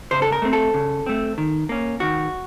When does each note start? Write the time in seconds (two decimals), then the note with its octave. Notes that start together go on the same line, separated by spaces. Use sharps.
0.11 C#3 C5
0.22 A4
0.32 A#4
0.42 A3 C4
0.53 A4
0.74 C#3
1.06 A3 C4
1.38 D#3
1.69 A#3 C#4
2.00 D#3 F#4